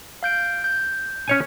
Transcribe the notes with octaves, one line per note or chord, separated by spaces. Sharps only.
F5 G6 D7
G6
C#4 C#5 G#5